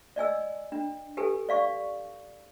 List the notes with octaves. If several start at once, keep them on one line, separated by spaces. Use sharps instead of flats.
D5 D#5 G#5 E6
D4
G4 A4 B4 G#5
D5 F5 C#6